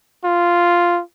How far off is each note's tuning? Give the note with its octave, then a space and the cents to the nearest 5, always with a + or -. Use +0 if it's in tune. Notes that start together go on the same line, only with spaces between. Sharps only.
F4 -5